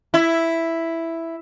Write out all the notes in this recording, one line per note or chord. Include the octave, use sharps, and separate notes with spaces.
E4